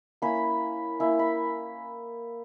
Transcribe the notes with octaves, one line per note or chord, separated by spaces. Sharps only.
A#3 C#4 E4 B5
A#3 C#4 E4
B5